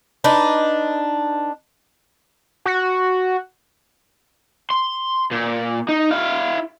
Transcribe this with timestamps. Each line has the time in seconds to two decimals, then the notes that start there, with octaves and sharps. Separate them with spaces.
0.24 D4 D#4 B4
2.66 F#4
4.70 C6
5.31 A#2
5.89 D#4
6.11 E4 F5